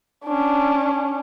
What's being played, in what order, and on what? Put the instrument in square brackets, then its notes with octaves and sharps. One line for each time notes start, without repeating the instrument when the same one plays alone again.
[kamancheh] C#4 D4